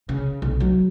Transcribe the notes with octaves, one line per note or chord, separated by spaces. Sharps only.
C#3
B1
F#3